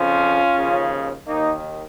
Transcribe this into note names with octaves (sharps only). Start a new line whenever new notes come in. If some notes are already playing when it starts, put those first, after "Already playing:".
Already playing: F2 C#3 F3 C#4 F4
D#2 C#3 F3
D#2 D#3 A#3 D#4